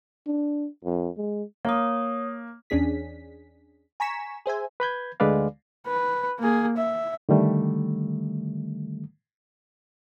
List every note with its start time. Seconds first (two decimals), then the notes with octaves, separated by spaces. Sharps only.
0.27 D4
0.84 F2
1.17 G#3
1.65 A#3 C#5 D#6
2.70 E2 C#4 D4 G#4 B6
4.00 G#5 A#5 C#6 B6 E7
4.46 G#4 C5 E5 G#5
4.80 B4 B5 G6 G#6
5.20 D2 D3 G#3 B4 D5 F5
5.87 B4
6.39 A#3 G#4
6.77 E5
7.29 D3 D#3 G3 A3